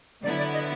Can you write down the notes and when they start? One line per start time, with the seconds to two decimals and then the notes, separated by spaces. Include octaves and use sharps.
0.23 D3 F#3 B3 E4 D5
0.38 D5
0.53 D#5